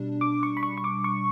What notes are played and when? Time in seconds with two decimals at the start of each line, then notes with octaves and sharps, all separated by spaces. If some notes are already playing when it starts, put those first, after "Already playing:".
Already playing: B2 G3 D4
0.21 D6
0.43 C#6
0.57 B5
0.63 C#6
0.77 C#6
0.84 D6
1.04 C#6